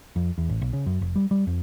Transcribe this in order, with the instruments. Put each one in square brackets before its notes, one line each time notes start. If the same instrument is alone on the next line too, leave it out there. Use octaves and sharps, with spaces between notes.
[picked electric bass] F2
E2
A1
B1
C#3
F#2
F1
G3
G3
F2